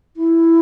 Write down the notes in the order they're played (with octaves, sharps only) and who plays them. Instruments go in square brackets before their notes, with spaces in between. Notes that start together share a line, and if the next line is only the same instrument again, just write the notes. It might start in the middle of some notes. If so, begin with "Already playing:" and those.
[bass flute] E4